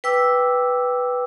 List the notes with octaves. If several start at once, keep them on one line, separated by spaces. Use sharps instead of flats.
B4 G5 D6 E6